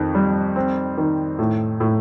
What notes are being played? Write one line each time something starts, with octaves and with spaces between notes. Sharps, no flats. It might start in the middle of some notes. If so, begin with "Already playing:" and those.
Already playing: F2 D#3
G3
C4
D#3
A2
A2